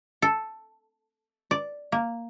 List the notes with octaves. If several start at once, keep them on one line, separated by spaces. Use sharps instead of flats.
A4
D5
A#3